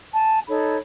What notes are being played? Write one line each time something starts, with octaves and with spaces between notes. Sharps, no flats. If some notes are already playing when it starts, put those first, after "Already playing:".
G#5 A5
D#4 A4 C#5 B5